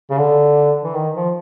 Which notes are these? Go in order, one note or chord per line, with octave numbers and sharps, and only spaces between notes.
C#3
D3
E3
D#3
F3